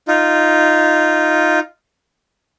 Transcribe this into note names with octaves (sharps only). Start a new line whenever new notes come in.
D#4 F4